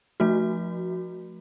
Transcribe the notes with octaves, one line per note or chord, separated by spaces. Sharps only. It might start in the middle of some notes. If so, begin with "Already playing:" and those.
F3 A3 F#4